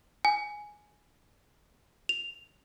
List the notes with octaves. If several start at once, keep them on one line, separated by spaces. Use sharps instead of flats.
G#5
F7